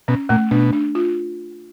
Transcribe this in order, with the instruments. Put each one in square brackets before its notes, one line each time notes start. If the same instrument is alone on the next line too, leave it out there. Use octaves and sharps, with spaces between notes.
[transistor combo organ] B2 [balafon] C#4
[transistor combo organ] A#2 [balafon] A3
[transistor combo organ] B2 [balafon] D4
[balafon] D4
F4